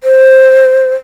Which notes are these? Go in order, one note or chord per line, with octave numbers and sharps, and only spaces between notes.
C5